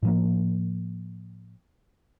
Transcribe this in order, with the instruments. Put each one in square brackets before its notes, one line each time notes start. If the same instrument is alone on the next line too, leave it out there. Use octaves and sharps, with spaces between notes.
[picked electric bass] A2 F3 A#3